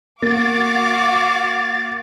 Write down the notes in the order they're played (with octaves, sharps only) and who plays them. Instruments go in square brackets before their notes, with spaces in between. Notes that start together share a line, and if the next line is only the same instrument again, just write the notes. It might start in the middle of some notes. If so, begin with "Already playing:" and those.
[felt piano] A#3 [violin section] F#4 F5 D6 [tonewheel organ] A6